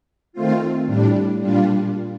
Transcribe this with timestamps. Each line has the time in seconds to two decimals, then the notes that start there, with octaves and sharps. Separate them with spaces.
0.33 D#3 A3 C4 F4
0.86 A2 G3 D4
1.39 A#2 G3 D4 F4